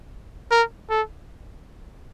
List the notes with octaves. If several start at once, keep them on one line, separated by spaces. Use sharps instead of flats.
A#4
A4